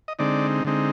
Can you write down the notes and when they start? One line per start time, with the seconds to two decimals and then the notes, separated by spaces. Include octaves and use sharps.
0.08 D#5
0.19 D3 G#3 C4 D#4 D5
0.65 D3 G#3 C4 D#4